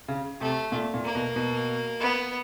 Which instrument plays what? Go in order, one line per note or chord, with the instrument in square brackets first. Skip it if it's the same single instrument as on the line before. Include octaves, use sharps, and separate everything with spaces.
[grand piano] C#3
[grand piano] C3 [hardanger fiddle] A3
[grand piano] A#2
A#2
[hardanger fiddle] A#3
[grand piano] B2
B2
[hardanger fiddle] B3